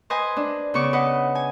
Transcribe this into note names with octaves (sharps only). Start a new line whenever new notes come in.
B4 C5 D#5 G#5
D4
C#3 B3 C#6 D6
B4 D#5 F#5
G#5